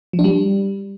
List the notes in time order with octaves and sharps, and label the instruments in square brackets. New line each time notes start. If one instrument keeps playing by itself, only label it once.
[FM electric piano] F3
D4
G3